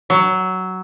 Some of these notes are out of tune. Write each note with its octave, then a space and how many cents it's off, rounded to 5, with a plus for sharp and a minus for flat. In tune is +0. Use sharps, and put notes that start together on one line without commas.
F#3 +10